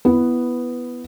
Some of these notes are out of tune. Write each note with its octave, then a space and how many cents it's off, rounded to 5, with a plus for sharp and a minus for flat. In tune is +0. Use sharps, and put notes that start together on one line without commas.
B3 +0 E4 +15 B4 +0